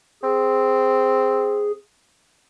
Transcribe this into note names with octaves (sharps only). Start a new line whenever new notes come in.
C4 G#4